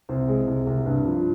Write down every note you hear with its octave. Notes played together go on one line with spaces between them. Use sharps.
C2 C5
G#3
C2
C2
G2
F3